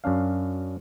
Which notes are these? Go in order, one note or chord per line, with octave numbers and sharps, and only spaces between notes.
F#2 C#4 D4 F5